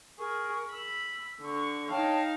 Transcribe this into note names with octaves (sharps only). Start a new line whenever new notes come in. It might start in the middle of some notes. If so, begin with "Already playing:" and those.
G#4 A#4 C#6
B5 E6
D3 C#6
D#4 C#5 F5 G5 A5